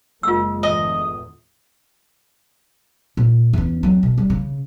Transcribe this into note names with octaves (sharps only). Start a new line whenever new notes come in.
F#1 G#3 A#3 F4 E6
E2 A2 D3 D#5 D#6
A#2
E2 C#4
F#3 C4
B2
G3
C#3